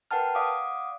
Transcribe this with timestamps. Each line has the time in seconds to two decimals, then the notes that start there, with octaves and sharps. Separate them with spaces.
0.11 A#4 B4 F#5 G5 A5 F6
0.35 D5 F5 F#5 D6 D#6